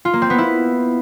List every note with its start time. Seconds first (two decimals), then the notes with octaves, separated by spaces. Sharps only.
0.05 F4
0.13 A#3
0.22 C4
0.30 B3
0.38 E4